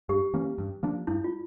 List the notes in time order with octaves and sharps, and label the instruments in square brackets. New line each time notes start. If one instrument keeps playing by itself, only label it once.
[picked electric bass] G2 [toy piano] G4
[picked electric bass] E3 A#3 C#4
G2
F3 A#3 D4
[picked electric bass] G2 [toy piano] E4
[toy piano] F4